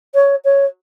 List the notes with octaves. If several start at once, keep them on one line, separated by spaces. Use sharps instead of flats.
C#5
C#5